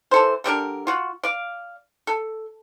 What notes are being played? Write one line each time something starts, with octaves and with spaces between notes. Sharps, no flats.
E3 A4 C5
D3 G3 D4 A#4
F4 F#4
D5 F5
A4